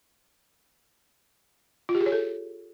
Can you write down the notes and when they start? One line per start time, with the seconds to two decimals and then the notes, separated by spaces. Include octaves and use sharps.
1.89 F4
1.95 G4
2.00 G#4
2.06 C#5
2.12 A4